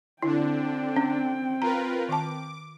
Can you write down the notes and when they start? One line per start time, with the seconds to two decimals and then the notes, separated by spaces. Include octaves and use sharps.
0.22 D3 C4 D4 E4 G5
0.96 C#4
1.62 F4 A#4 B4 A#5
2.09 D#3 A5 D6